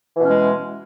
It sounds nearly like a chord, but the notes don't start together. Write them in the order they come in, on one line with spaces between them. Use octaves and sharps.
E3 B2 C#4 G#3